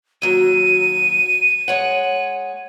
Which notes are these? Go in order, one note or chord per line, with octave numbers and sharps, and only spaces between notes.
D#2 F#3 D#7
G#3 C#5 F#5